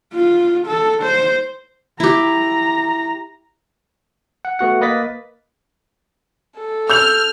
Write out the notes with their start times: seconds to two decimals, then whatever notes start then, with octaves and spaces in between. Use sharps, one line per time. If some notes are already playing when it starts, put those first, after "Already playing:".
0.14 F4
0.67 A4
1.03 C5
2.00 E4 G4 A#5
4.45 F#5
4.59 A3 B3 F#4 F#5
4.81 A#3 B4 D#5 A6 B6
6.57 A4
6.90 E6 F6 G6 F7